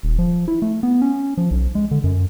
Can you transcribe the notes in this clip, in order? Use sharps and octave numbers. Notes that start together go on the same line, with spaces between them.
D#1
F3
E4
A3
B3
C#4
F3
B1
G#3
D3
F#2